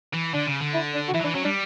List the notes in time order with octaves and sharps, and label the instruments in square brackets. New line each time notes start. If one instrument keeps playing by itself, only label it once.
[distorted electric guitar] E3
[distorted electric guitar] D3 [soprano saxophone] D4
[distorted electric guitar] C#3
D3
[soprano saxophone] E4
D4
F#4
[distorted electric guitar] E3 [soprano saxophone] E4
[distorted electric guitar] F#3
[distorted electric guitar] E3 [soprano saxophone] D4
[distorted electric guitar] F#3 [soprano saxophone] C#4
[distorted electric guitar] G3 [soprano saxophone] D4